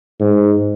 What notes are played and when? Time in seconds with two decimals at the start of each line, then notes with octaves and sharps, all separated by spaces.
0.20 G#2